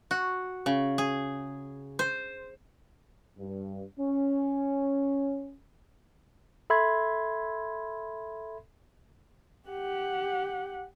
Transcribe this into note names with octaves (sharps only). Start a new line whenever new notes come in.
F#4
C#3
G#4
C5
G2
C#4
A4 E5 B5 C6 G#6
G4 F#5